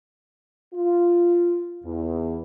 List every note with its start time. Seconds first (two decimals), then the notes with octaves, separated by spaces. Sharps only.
0.73 F4
1.84 E2